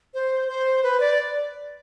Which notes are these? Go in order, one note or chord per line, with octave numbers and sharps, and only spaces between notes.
C5
C5
B4
D5